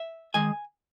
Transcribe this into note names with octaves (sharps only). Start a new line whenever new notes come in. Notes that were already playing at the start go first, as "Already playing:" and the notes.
Already playing: E5
D#3 G#3 G#5